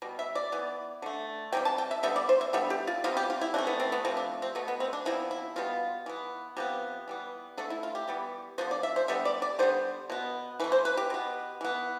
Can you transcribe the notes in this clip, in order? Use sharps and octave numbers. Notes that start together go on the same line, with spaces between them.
B2 G3
E5
D5
E3 B3
D3 A3
C3 E3 G3 G5
A5
G5
E5
D3 G3 B3 E5
D5
C5
E5
D3 G3 B3 E5
G4
F4
C3 G3 B3 F4
G4
F4
E4
C3 E3 A3 D4
B3
C4
B3
C3 F3 A3 C4
D4
C4
B2 A3 B3
B3
C4
D4
C3 F3 B3 E4
E4
B2 G3 B3 F4
E3 B3
C3 F3 B3 G4
E3 G3 B3
D3 A3 A4
E4
F4
G4
E3 G3 B3
D3 F3 B3 C5
D5
E5
C5
D3 G3 B3 E5
D5
D5
D3 G3 B3 C5
B2 B3
E3 A3 B4
C5
B4
G4
B2 B3
E3 B3